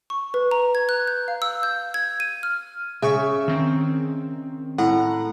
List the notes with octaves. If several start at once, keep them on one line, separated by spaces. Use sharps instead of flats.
C#6
B4
A#5
G#6
F#6
G6
F5
E6
G6
G#6
D#7
F6
C#3 E5 G#5 C#6
D#3 C4
A2 F#5 A#5